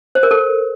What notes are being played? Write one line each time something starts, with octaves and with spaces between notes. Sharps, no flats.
C5
A#4
A4